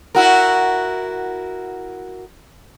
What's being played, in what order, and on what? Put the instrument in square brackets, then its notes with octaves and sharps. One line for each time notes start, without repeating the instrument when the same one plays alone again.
[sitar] E4 F#4 A#4